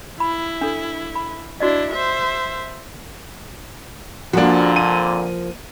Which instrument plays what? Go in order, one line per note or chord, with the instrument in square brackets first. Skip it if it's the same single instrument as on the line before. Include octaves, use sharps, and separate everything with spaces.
[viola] E4 [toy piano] B5
[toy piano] D4 A4
B5
[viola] D4 E4 [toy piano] F#4 D5 D#5
[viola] C5 E5
[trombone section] F2 A#2 D3 [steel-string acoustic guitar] F3 A#3 [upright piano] D4 F#4
[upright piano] D#7